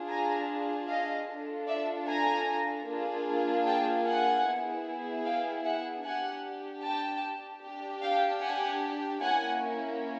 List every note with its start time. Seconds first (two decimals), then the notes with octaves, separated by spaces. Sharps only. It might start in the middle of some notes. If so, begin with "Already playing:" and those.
Already playing: D4 F4 G#4
0.08 G#5 A#5
0.88 D#5 F5
1.28 D4 F4 A4
1.67 D5 E5
2.07 G#5 A#5
2.86 A#3 D4 F4 G#4
3.66 G5 A5
4.05 F#5 G#5
4.45 B3 E4 G#4
5.24 F5 G5
5.64 E5 F#5
6.04 D4 G4 F#5 G#5
6.83 G5 A5
7.62 D4 G4
8.02 F5 G5
8.42 F#5 G#5
9.22 A#3 C#4 E4 F#5 G#5